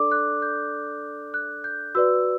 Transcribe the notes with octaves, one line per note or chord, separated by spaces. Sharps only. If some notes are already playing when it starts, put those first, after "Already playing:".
Already playing: D4 A4 D5 D6
F#6
G6
F#6
G6
F#4 B4 D5 E6